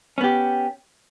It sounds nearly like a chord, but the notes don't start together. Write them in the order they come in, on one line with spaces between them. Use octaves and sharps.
C#4 B3 G4